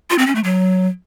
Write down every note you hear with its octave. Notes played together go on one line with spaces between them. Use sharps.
F4
C4
C#4
A3
F#3